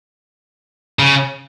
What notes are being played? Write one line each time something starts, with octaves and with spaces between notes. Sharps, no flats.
C#3